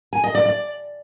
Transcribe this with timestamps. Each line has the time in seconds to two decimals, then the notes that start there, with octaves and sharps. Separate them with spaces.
0.13 G#5
0.24 D#5
0.35 D5
0.46 D5